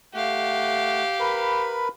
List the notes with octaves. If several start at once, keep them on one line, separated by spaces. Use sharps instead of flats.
A3 G4 F5 F#5
A#4 B4 B5